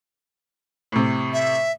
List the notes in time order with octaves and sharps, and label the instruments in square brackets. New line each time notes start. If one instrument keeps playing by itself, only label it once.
[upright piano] A2 C3
[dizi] E5